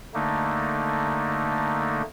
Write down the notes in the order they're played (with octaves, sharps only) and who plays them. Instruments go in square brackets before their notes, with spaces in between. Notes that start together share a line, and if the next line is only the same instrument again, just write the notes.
[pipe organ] D3 A3 A#3 D#4